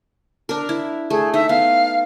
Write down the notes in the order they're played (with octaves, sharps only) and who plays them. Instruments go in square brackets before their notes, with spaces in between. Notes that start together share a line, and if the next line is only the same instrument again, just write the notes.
[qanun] D4 A#4
E4
[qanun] A3 [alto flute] G#4
[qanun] D#4 [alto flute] E5
[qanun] B3 [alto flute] F5